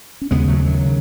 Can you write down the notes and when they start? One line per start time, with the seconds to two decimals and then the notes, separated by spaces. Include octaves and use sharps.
0.21 C#4
0.31 D#2 C#3 G#3 B3
0.48 F#3 A3
0.66 D#3 F#3
0.86 C#3